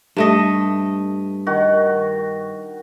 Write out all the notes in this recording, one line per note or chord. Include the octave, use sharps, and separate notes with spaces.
G2 A3 D#5
D#3 F#4